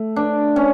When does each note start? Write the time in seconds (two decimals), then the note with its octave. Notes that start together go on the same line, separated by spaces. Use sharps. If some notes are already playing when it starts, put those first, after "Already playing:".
Already playing: A3
0.16 D4
0.56 C#4